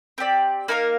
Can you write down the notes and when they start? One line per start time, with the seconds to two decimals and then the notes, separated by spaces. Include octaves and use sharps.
0.18 C4 G4 D5
0.68 A#3 D#4 A#4 F5